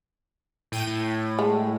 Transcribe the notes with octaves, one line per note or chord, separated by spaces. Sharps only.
A2 G5 D#7
A2
G#3